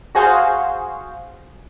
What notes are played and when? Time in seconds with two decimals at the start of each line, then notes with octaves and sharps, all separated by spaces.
0.15 F#4 G#4 C5 F5